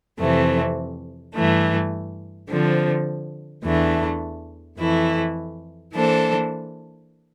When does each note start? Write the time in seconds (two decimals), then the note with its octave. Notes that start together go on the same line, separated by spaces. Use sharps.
0.19 F2 C3 E3 A3 C4
1.34 G2 E3 A3
2.49 D3 F3 C4
3.64 E2 E3 A3 D4
4.78 F2 E3 A3 E4
5.94 E3 A#3 D4 A4 C5